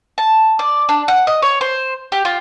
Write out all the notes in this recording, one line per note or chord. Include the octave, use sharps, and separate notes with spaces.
A5
D5
D4
F#5
D#5
C#5
C5
G4
F4